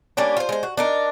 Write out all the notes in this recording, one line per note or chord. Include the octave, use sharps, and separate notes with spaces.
G3 A#3 C#4 D4
F4 C5
G#3 C5
F#4
D4 D#4 A#4